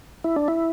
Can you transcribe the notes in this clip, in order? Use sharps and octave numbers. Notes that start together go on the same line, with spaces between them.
E4
D4
E4